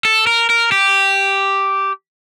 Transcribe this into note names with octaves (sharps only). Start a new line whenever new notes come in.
A4
A#4
A#4
G4